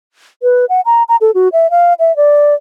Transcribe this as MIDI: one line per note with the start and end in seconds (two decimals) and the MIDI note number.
0.43 0.65 71
0.69 0.81 78
0.86 1.03 82
1.09 1.16 82
1.21 1.31 69
1.35 1.48 66
1.53 1.70 76
1.71 1.94 77
1.99 2.15 76
2.16 2.54 74